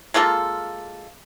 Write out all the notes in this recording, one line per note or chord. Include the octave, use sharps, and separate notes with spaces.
G#3 A#3 F4 A4